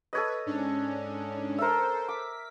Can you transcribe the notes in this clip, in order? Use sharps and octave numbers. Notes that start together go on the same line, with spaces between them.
A4 B4 C#5 D#5
G#2 C#4 D4
A4 A#4 C5 E5
D6 B6